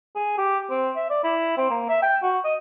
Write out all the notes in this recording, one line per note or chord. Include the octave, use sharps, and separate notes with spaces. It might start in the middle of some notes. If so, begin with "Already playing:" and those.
G#4
G4
C4
E5
D5
E4
C4
A#3
E5
G5
F#4
D#5